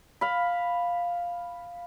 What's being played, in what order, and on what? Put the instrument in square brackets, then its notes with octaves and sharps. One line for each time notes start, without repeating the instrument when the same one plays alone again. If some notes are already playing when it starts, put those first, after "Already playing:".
[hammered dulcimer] F5 B5